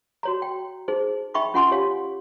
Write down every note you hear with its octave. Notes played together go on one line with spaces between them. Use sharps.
F#4 C#5 A#5
G5
D#4 G#4 C5
D#4 E5 G5 B5 C#6 D6
C#4 F4 F#5 G#5 C6 D6
G4 C#5 F5